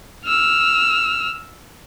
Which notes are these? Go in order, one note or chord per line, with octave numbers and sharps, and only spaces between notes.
E6 F6